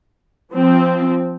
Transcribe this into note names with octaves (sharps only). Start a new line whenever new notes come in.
F3 C4